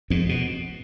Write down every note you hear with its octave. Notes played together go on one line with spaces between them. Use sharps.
F2 G#2
B2